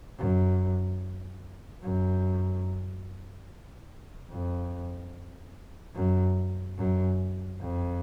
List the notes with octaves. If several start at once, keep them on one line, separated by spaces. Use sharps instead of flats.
F#2
F#2
F2
F#2
F#2
F2